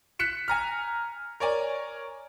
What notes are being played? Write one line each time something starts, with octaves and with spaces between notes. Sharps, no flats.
F#6 B6 C#7 E7
G#5 A#5 F6
A#4 C#5 D5 G#5